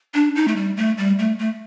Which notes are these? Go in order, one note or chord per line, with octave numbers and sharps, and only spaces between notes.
D4
D#4
A3
G3
A3
G3
A3
A3